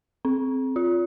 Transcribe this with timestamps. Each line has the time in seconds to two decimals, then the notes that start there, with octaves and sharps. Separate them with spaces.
0.25 C4
0.76 F4